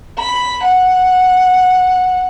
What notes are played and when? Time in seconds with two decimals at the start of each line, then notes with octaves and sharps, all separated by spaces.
0.17 B5
0.63 F#5